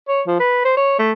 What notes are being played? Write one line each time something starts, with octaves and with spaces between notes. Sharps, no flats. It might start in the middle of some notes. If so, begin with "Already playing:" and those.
C#5
F3
B4
C5
C#5
A3